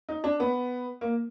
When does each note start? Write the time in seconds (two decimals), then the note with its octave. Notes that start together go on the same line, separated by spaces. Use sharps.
0.09 D#4
0.24 D4
0.40 B3
1.01 A#3